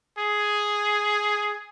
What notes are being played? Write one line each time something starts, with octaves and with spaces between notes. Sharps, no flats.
G#4